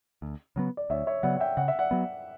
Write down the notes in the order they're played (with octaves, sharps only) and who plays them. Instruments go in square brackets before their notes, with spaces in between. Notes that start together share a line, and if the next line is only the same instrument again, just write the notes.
[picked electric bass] D2
C#3 F#3 B3
[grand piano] D5
[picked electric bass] D2 [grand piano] C#5 E5
[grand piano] C#5 E5
[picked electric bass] C#3 F#3 B3 [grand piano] D5 F#5
[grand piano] F#5
E5 G5
[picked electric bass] C#3 [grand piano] F#5
[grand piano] E5
D5 F#5
[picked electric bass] F#3 B3